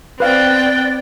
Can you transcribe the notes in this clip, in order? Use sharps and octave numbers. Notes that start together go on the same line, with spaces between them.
B3 C4 B4 D5 F5 G5 F#6